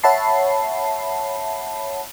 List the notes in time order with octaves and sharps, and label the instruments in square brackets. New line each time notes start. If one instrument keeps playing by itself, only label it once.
[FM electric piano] C#5 E5 F#5 A5 B5 C7